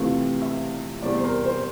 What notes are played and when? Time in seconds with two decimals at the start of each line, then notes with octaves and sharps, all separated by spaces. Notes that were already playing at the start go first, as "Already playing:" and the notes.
Already playing: F2 C3 E3 A3 C4 F5
0.42 E5
1.02 E2 C3 G3 C4 D5
1.18 C5
1.24 A#4
1.44 C5